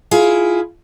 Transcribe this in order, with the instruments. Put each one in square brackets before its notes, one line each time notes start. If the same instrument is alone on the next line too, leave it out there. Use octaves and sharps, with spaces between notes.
[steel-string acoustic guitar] E4 F4 G#4